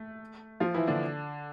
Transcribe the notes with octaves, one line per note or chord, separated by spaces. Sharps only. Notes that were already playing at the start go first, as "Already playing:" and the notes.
Already playing: A3
F3 F4
E3 E4
D3 D4